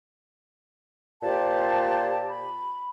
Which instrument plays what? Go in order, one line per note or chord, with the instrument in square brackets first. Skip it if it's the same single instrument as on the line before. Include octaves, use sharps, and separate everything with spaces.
[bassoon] A#2 [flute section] G4 C5 A5
[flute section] B5